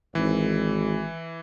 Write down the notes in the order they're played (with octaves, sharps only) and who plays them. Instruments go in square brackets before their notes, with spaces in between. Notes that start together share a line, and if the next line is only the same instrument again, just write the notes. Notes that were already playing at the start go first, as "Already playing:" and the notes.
[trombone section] G#1 [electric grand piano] E3